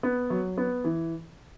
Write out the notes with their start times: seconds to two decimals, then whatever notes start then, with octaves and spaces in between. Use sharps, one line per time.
0.03 B3
0.30 F#3
0.57 B3
0.84 E3